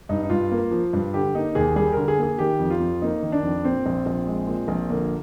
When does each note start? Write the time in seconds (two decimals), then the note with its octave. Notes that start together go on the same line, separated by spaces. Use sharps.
0.09 G2 D#4
0.23 D#4
0.30 G2 F4
0.52 A#3
0.71 F3
0.93 G2
1.14 D3 G4
1.34 A#3 D#4
1.55 D#2 G#4
1.76 G3 G#4
1.92 D3 A#4
2.08 G#4
2.18 A#3 G#4
2.39 D#3 G4
2.59 F2
2.70 F4
2.80 F2
3.02 A#3 D#4
3.22 D#3
3.32 D4
3.43 F2
3.64 A#2 C4
3.86 A#1
4.06 A#1
4.27 G#3
4.47 A#2
4.68 A#1
4.90 D3 A#3